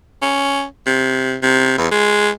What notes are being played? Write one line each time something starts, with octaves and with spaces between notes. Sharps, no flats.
C#4
C3
C3
E2
G#3